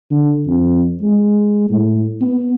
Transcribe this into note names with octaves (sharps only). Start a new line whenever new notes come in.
D3
F2
G#3
A2
B3